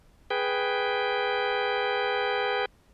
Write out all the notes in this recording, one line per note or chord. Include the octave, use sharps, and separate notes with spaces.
G#4 B4 G5